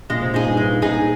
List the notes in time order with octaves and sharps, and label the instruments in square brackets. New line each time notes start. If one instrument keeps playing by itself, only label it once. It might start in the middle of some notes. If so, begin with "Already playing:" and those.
[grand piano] A#2 [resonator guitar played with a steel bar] G#3
[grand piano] C3
[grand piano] A#2 [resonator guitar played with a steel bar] D#4 G#4
[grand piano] G2
[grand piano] G#2 [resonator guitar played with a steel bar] G#3
[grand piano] A#2 [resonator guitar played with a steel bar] D#4 G#4